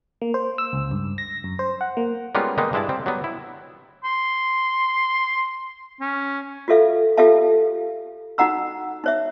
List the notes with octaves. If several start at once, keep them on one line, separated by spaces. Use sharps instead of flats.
A#3
C5
E6
C#2
G2
A#6
F#2
C5
F#5
A#3
G3 G#3 A#3 B3 C#4 F4
D#3 G3 G#3 A#3 B3 D#4
G2 G#3 E4 D5 A5
G3 C4
F#3 G3 B3
E4
C6
C#4
F4 F#4 A4 E5 F5
F4 G4 A4 E5 F5 A5
D#4 F#4 F#5 A#5 E6
D#4 C#5 E5